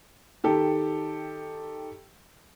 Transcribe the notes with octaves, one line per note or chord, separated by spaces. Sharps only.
D#3 G4 A4